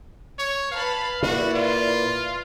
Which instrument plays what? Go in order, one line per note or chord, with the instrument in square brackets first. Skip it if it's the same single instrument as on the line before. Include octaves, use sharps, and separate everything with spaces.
[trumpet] C#5
[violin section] B4 A5 B5 [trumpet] F5
[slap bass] A#2 [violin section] E4 B4 D5 [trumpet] F#4
[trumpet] F4